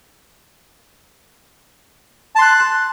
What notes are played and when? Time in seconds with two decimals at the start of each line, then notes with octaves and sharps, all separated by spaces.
2.35 A5
2.39 C6
2.42 F#6